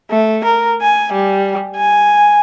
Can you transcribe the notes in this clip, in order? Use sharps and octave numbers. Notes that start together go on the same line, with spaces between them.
A3
A#4
G#5
G3
G#5